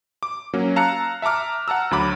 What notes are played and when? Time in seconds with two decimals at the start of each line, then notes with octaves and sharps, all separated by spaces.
0.23 D6
0.54 F#3 A#3 C#4
0.76 F5 A5 A#5 E6 F#6 C#7
1.22 E5 A5 A#5 D6 F6
1.68 F#5 A5 A#5 E6
1.91 D2 F#3 B5 D6